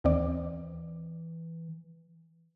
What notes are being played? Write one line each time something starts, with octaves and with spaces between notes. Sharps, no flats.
D#2 E3 C4 D5